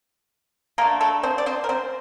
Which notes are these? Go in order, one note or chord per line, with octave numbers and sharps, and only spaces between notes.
D3 A3 A#3 A#4
A3 A4
C4 C5
D5
C4 C5
A#4
C4 C5